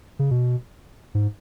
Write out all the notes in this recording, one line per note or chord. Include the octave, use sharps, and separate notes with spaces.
C#3
B2
G#2